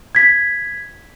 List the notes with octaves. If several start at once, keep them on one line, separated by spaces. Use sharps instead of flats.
G#6 B6